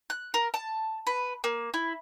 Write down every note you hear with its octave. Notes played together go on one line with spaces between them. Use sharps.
F#6
A#4
A5
B4
A#3
E4